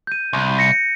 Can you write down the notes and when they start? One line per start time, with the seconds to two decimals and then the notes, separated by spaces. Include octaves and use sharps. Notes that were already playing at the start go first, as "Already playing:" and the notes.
0.07 G6 D#7
0.33 C2
0.59 A#6 C#7